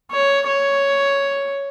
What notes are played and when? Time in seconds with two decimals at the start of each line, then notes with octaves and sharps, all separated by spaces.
0.12 C#5
0.47 C#5